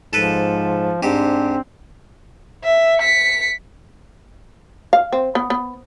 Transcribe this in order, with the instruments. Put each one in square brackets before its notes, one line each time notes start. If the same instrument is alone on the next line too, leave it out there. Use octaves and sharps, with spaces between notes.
[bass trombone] G#2 [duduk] F3 [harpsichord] A4 B4
[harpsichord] G#2 G4 [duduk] C4 [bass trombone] D4
[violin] E5
B6 C#7
[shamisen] F5
C4
B3
B3